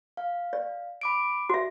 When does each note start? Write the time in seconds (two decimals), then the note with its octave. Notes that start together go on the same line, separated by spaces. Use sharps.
0.17 F5
0.53 D5
1.01 B5 D6 D7
1.49 F#4 E5